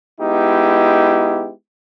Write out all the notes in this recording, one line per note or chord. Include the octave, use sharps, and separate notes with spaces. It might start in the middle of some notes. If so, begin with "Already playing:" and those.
G#3 B3 D#4 E4 G4